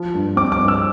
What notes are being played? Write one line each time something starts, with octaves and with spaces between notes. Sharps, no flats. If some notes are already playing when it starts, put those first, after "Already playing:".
Already playing: F3
G2
C4 D6
D6
G2
E6